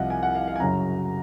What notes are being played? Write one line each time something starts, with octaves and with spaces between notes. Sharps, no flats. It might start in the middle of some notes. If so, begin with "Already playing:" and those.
Already playing: C2 C3 F3 D#5 F5 F#5
G#5
F#5
F5
F5
G#5
F#2 C#3 F#3 A#5